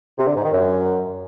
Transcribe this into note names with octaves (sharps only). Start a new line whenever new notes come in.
C3
D3
G#2
D#3
F#2